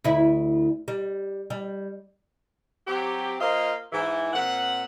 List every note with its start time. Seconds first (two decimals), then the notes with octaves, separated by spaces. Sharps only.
0.04 D2 E4
0.88 G3
1.50 G3
2.88 F#3 C4 G4
3.40 A#3 F4 C5 D#5 F5
3.92 G#2 E3
4.34 A#2 C4 F#5